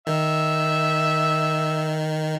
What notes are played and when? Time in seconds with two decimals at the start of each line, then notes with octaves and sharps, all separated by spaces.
0.07 D#3 E5